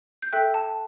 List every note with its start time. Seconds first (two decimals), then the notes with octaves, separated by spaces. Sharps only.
0.22 G6
0.33 A4 E5 G5 F#6
0.54 A5